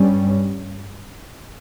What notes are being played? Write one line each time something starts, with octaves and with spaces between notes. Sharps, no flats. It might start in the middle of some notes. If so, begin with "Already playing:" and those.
Already playing: G2 G3 C#4